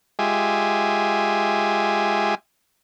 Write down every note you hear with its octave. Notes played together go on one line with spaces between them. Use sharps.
G#3 F4 G4 E5 G#5